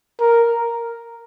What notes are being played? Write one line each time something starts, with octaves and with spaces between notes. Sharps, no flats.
A#4